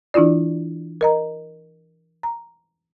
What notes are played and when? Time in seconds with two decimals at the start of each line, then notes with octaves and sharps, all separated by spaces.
0.14 E3 D4 E4 F4 D5
1.01 A#4 D#5 A#5
2.23 A#5